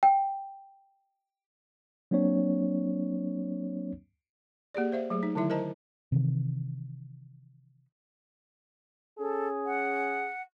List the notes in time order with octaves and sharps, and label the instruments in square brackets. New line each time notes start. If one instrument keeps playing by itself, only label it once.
[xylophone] G5
[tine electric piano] F#3 A#3 C4 D4 C#5
[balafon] A#3 G4 G#4 D5
C5 E5 F5
F#3 A3 G#4
D#4
D3 D#3 F#3 E4 E5
A#4 C5 D#5 A5 A#5
[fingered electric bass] C3 D#3 E3
[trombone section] C#4 G#4 [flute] A4
[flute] F#5